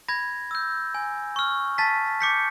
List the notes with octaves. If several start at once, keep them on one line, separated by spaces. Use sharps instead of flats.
B5 G#6 A#6
E6 G6
G#5
C#6 F6
A5 A6 B6
D6 G6 B6 C#7